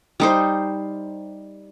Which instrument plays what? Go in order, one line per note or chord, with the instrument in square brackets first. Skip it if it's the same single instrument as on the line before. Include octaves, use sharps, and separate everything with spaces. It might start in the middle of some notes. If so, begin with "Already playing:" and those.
[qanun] G3 D#4 C5